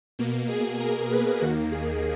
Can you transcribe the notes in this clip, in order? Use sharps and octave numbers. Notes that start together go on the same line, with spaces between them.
B2 A#3
G#4
A#4
B4
D#2 D#3 A#3 F#4
G#4